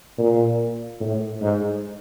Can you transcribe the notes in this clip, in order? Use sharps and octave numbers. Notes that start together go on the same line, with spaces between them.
A#2
A2
G#2